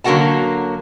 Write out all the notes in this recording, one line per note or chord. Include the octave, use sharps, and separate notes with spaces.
D3 F#3 A#3 F#4 F#5 A5